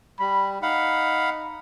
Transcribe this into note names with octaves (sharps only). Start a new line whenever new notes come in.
G3 B5
D#4 F5 F#5 B5